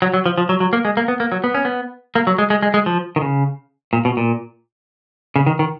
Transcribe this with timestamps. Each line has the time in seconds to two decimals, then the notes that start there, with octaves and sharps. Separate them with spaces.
0.02 F#3
0.14 F#3
0.26 F3
0.38 F3
0.49 F#3
0.60 F#3
0.73 A#3
0.85 G#3
0.97 A#3
1.08 B3
1.20 A#3
1.32 F#3
1.44 B3
1.54 C#4
1.65 B3
2.15 A#3
2.27 F#3
2.38 G#3
2.50 G#3
2.63 G#3
2.74 G#3
2.86 F3
3.16 D#3
3.21 C#3
3.93 A#2
4.05 B2
4.17 A#2
5.36 C#3
5.46 D#3
5.59 D#3